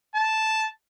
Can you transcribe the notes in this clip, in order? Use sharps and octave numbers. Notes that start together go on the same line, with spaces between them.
A5